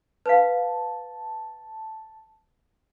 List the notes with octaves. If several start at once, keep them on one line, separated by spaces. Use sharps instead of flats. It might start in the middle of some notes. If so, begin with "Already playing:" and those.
B4 F5 A5